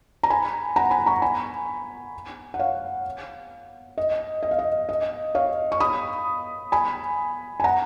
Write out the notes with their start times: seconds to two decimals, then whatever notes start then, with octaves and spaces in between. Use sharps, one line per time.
0.23 A#5
0.30 G#5 B5
0.76 F#5 A#5
0.91 G#5 B5
1.06 A#5 C#6
1.22 G#5 B5
2.54 F#5
2.59 C#5 F5
3.98 D#5
4.43 D#5
4.51 F5
4.59 D#5
4.89 D#5
5.35 C#5 F5
5.72 C#6
5.80 B5 D#6
6.72 G#5 B5
7.60 G#5
7.64 F#5 A#5